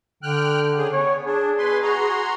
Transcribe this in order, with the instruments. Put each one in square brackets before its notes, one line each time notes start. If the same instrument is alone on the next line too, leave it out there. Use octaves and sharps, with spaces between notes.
[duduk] D3 [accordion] G5 F6 F#6
[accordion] C#3 G#4
[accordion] B3 [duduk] C#5
[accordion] D4 [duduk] G#4
[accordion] B2 B4 C6
F#4 A#5 C6